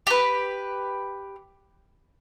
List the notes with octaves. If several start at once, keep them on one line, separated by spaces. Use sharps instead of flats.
G4 B4